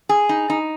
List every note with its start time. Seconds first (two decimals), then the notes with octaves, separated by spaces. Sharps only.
0.09 G#4
0.29 D#4
0.50 D#4